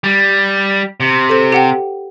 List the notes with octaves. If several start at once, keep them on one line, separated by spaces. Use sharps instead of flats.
G3
C3
A4 C5
G4 F#5 G5